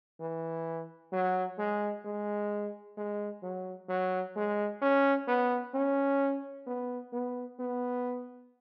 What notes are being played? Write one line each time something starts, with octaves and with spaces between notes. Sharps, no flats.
E3
F#3
G#3
G#3
G#3
F#3
F#3
G#3
C#4
B3
C#4
B3
B3
B3